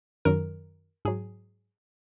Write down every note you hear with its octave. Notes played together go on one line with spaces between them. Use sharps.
F#2 D#3 F#3 A#4
G#2 F#3 G#4